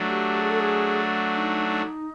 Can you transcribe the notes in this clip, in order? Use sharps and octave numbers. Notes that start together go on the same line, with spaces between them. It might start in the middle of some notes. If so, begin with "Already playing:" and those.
Already playing: F#3 A3 D4
G4
G#4
A4
G#4
D#4
D#4